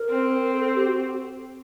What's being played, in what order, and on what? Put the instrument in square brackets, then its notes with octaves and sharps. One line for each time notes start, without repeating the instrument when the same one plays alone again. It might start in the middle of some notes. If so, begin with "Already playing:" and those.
Already playing: [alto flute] A#4
[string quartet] C4
[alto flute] A4
A4
G4
F#4